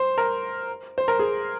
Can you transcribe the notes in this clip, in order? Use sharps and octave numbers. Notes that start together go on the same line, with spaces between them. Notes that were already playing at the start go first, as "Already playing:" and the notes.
Already playing: C5
A#4
C5
A#4
G#4